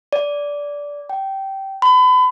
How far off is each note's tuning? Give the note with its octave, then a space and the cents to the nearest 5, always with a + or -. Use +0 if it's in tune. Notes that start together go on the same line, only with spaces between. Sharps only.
D5 -15
G5 -15
B5 +35